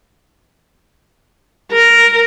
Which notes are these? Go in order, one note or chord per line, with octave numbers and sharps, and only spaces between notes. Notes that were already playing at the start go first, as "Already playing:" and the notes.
A#4